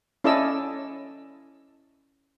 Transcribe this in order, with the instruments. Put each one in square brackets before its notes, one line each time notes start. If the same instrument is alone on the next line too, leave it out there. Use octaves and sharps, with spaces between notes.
[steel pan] C#4 E4 A4 D5 D#5 E6